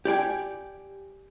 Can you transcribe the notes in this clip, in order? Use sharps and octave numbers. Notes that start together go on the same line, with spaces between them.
G4 D5 G5 G#5